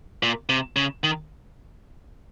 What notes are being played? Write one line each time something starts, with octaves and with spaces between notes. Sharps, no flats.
A#2
C3
C#3
D#3